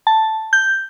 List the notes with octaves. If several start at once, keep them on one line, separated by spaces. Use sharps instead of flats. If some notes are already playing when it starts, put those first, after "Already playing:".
A5
G6